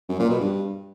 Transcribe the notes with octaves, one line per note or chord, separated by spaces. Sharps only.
F#2
A#2
B2
G2